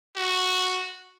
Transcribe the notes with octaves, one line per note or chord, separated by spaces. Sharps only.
F#4